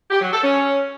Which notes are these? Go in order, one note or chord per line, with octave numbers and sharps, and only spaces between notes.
G4
F#3
A4
C#4